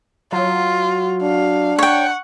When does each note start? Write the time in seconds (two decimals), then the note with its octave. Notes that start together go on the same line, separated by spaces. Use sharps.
0.32 F#3 F4
1.22 D4 F5
1.79 C#5 F#5 G5 C#6